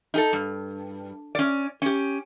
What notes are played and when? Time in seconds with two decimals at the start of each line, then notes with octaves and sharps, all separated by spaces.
0.14 D#4 G#4 A4
0.33 G2
1.35 C#4 D5
1.82 C#4 G4